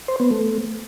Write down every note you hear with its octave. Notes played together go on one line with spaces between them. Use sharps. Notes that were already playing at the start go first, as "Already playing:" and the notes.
C5
B3
A3